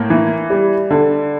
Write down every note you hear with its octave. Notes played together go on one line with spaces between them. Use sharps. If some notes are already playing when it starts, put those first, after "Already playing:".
Already playing: A2 A#3
E3
G3
D3